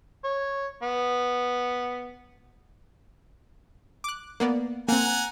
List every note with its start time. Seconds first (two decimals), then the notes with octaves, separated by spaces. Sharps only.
0.24 C#5
0.83 B3
4.04 D6 F#6
4.40 A#3 B3 D5
4.89 A#3 C4 F#5 G#5 A#5